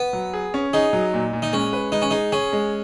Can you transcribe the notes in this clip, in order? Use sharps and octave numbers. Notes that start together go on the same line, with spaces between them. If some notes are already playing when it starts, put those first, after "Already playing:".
Already playing: B3
F#3
G#4
C#4
D#4 G#4
F#3
A#2
A#2
D#4
G#3 C#4
B4
G#3 D#4
C#4
D#4 G#4
C#4 G#4
G#3